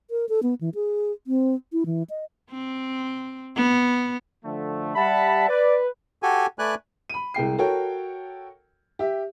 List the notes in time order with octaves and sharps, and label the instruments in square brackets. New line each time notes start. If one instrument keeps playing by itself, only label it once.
[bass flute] A#4
A4
B3
E3
G#4
C4
E4
E3
D#5
[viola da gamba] C4
B3
[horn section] D3 F3 A3
[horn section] G3 A5 [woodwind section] E5 F#5 B5
[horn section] B4 [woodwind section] D5
[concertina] F#4 G4 A4 G#5
A3 B4 D5 G#5 F#6
[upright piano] B5 D#7
C2 G#3 G5 C7
F#4 A4 A#4 C#5 G5
G4 E5